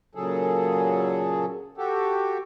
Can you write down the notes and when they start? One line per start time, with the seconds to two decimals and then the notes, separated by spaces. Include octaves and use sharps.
0.15 A#2 C#3 F#3 G#4 A4
1.78 F#4 G4 A4